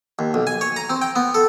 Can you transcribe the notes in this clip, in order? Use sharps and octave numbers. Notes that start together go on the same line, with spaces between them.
D#2
B1
G#5
C#5
A#5
C4
G5
B3
A4